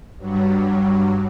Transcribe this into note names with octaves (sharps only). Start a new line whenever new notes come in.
G2 F#3 G3